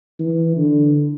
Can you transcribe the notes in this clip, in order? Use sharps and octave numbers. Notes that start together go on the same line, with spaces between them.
E3
D3